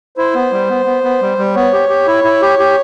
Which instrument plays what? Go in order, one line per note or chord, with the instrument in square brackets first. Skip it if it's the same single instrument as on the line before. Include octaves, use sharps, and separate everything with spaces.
[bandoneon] E4 [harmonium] C5
[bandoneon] B3
G3
B3
B3
B3
G3
G3
[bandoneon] B3 [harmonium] C#5
[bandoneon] G4
G4
E4
E4
G4
G4